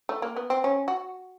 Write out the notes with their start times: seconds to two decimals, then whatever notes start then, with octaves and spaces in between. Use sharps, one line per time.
0.09 A3
0.22 A#3
0.36 B3
0.50 C4
0.64 C#4
0.88 F#4